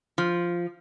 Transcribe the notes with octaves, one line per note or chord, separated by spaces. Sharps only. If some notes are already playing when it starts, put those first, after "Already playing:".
F3